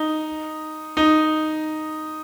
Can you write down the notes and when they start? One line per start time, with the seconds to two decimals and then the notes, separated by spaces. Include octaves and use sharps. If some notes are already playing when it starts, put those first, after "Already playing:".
Already playing: D#4
0.97 D#4